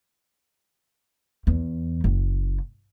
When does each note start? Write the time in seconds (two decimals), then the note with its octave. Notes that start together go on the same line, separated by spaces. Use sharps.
1.47 E2
2.04 F#1